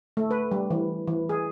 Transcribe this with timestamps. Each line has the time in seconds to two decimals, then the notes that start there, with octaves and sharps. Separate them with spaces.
0.17 A3
0.31 B4
0.51 G3
0.70 E3
1.07 E3
1.29 G#4